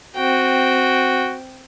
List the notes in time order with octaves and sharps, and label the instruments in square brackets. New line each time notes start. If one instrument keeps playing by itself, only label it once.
[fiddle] C4 G5 [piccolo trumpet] F#4